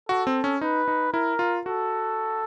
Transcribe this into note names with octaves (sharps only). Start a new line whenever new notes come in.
F#4 A4
C4
C#4
D#4 B4
D#4
E4 A#4
F4
F#4 A4